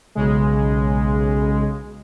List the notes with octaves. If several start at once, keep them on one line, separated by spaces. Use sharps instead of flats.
B1 C#3 G#3